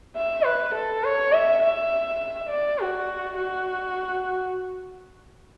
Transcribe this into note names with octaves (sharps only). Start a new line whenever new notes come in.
E5
B4
A4
C#5
E5
E5
D5
F#4
F#4